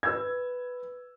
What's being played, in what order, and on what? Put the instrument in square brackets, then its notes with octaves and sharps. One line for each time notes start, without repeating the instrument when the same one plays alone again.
[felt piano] B4 E6 G#6